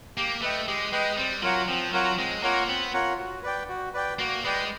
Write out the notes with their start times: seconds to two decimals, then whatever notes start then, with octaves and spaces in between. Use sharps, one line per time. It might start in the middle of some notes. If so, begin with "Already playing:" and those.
0.17 A#3 G4
0.42 A3 B4 D#5 G5
0.68 G#3 G4
0.92 G#3 B4 D#5 G5
1.17 G3 C4
1.42 F#3 F4 A#4 C#5 F#5
1.68 F3 C4
1.93 F#3 F4 A#4 C#5 F#5
2.18 G#3 C4
2.43 A#3 F4 A#4 C#5 F#5
2.68 B3 C4
2.94 F4 A#4 C#5 F#5
3.19 F#4
3.43 B4 D5 G5
3.69 F#4
3.94 B4 D5 G5
4.19 A#3 F#4
4.44 G#3 B4 D5 G5